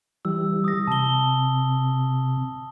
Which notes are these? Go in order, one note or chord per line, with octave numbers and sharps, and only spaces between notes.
E3 G3 E6
D#6 A#6
C3 A5 G7